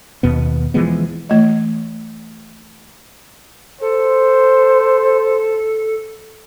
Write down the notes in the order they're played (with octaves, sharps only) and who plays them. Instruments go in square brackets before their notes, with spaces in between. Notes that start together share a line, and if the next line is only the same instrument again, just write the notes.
[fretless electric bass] D#2 B2 B3
E3 F3 G#3 B3
[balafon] E3 A3 D#5
[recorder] A4 [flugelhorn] C5